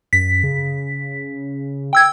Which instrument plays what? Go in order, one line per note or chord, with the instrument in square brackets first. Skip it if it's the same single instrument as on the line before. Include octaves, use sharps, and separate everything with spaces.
[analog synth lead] F#2 [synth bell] B6
[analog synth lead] C#3
[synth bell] G5 E6 G#6